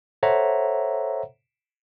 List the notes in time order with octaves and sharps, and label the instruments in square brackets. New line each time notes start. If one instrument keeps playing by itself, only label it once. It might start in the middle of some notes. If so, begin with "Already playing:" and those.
[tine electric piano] A4 C5 C#5 E5 F#5 A#5